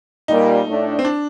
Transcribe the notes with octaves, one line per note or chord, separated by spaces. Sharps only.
A#2 G3 A#3 D#4
A2 A3 D4
C4
D4